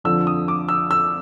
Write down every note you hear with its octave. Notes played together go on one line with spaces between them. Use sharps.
F2 D3 F3 E6
D#6
D6
E6
E6